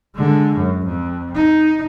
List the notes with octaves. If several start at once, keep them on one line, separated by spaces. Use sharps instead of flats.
D3 G#3
F#2
F2
D#4